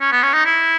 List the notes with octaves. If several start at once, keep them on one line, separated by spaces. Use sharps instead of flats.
C#4
B3
C#4
D#4
E4